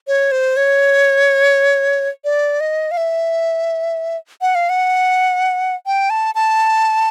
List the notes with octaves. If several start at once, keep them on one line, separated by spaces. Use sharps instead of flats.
C#5
C5
C#5
D5
D#5
F5
E5
F#5
F5
F#5
G5
A5
A5